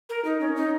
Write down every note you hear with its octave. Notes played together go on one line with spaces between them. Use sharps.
A#4
D#4
C#4
D#4